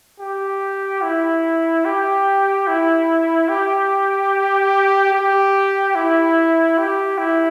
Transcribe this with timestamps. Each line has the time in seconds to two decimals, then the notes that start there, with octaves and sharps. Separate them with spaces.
0.20 G4
1.03 E4
1.85 G4
2.67 E4
3.49 G4
5.13 G4
5.95 E4
6.78 G4
7.18 E4